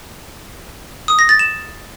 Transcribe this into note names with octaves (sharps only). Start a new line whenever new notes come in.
D#6
A#6
A6
E7